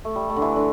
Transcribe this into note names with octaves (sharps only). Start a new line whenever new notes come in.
A3
G3
A3
D3
E3
D3